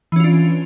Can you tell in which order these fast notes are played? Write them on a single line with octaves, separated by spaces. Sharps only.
E3 C#4 F4 D4